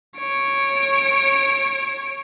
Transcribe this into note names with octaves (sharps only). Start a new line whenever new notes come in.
C#5 D7